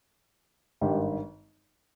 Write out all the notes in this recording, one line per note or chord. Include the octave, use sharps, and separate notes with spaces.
G#1 G2 D#3 G4